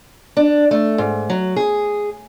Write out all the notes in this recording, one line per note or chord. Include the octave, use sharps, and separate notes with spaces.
D4
A3
G#2
F#3
G#4